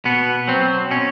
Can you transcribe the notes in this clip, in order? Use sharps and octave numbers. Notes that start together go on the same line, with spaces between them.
B2 B3
F#3 C4
B2 C#4